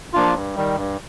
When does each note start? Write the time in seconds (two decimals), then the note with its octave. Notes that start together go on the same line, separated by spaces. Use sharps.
0.13 F3 A#3 D4 F4
0.35 G2
0.56 D#3 G3
0.76 G2